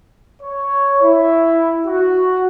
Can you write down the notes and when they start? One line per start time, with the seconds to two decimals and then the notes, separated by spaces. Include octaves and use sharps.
0.42 C#5
1.02 E4
1.86 F#4